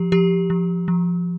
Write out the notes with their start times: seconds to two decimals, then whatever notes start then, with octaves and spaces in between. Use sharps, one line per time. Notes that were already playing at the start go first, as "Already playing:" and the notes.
Already playing: F3 G4
0.12 F3 G4
0.50 F3
0.88 F3